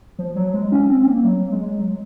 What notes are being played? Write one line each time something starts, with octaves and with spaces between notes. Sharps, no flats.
F3
F#3
G#3
C#4
C4
A#3
F#3
G#3
F#3